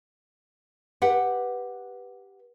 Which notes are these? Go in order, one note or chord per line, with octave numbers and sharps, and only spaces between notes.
G4 B4 F#5